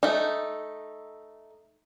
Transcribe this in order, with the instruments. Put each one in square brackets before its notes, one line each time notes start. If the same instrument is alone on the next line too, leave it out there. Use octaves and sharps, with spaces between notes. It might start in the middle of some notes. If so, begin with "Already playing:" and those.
[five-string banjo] A3 D#4